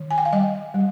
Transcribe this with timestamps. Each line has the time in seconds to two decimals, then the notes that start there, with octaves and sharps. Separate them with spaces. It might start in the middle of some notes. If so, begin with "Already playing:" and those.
Already playing: D#3
0.11 G#5
0.18 G5
0.25 F5
0.32 G3 D#5
0.74 G3